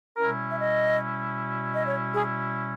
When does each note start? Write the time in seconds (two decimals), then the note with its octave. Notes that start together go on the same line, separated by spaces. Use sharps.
0.17 B2 G3 C#4 E4 A#4
0.51 E5
0.59 D#5
1.74 D#5
1.86 C#5
2.13 G#4